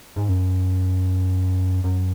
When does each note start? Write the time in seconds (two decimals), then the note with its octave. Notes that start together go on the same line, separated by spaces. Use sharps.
0.16 G#2
0.28 F#2
1.84 F#2